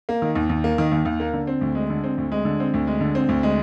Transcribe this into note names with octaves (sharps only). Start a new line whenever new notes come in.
A#3
D#3
D#2
D#2
A#3
D#3
D#2
D#2
A#3
D3
C4
D2
G#3
D3
C4
D2
G#3
D3
C4
D2
G#3
D3
C4
D2
G#3